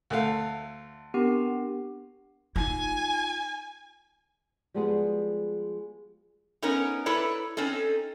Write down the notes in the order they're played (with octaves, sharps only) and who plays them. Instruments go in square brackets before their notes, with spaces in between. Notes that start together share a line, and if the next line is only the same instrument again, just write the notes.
[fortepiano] D2 A3 F5
[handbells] B3 G4 [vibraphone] C4 D4 A#4
[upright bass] D#4 F4 [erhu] G#5
[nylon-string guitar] F3 G3 G#3 B3 F#4 G#4
[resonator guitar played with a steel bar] B3 C#4 D#4 A#4
E4 A4 B4 C#5 D5
C4 C#4 D#4 A4